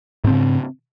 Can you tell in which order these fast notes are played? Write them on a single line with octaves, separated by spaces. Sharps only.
G#2 C4 C#3